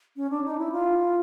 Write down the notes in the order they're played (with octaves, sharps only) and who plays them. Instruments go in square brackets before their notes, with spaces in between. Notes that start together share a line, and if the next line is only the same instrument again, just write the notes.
[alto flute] C#4
D4
D#4
E4
F4